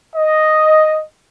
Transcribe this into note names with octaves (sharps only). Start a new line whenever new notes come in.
D#5